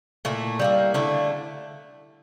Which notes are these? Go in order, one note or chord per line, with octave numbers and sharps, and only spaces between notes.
A#2 A3 E4
G3 A#3 E4
D3 A3 E4